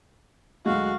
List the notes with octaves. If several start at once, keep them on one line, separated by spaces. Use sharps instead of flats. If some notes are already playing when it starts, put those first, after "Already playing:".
D2 F#3 G#3 F#4 F5